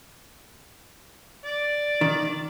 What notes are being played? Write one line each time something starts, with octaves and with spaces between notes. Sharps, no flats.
D5
D#3